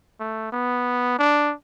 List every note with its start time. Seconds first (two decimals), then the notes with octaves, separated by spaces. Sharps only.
0.20 A3
0.53 B3
1.19 D4